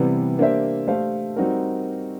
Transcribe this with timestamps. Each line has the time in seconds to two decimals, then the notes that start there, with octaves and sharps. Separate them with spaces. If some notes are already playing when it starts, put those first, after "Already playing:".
Already playing: C3 E3 G3 B3
0.39 A#3 D4 G4 C5 E5
0.87 A3 D4 G4 C5 F5
1.36 G3 C4 D#4 F#4 A#4